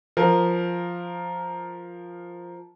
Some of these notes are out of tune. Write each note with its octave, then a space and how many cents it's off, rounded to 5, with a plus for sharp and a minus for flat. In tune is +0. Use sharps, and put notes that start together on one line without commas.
F3 +0 A#4 +0